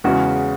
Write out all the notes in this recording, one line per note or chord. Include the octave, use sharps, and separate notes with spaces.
E2 C#3 G#3 C#4 F#4